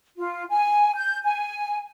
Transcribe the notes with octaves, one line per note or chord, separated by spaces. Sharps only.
F4
G#5
G6
G#5